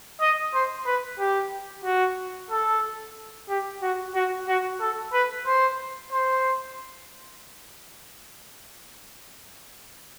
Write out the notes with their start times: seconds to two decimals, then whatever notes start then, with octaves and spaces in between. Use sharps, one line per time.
0.21 D#5
0.54 C5
0.86 B4
1.19 G4
1.85 F#4
2.51 A4
3.49 G4
3.82 F#4
4.15 F#4
4.48 F#4
4.80 A4
5.13 B4
5.46 C5
6.12 C5